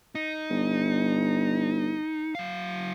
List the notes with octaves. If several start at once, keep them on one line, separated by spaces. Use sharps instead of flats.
D#4
G1
F#3 F5